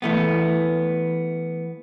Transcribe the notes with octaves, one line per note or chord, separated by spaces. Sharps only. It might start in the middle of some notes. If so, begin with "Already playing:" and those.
E3 A3 B3